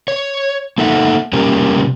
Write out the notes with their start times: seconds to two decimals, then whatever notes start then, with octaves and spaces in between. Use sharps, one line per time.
0.08 C#5
0.78 A#3 D#4 A4 E5 F#5
1.33 C3 G3 A#3 C#4 G4 A#4